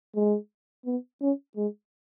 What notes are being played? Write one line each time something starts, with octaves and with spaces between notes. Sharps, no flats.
G#3
B3
C#4
G#3